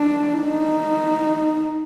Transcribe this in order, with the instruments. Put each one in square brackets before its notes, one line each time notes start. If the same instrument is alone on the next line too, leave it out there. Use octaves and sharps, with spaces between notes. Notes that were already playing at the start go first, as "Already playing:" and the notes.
Already playing: [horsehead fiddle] D4
D#4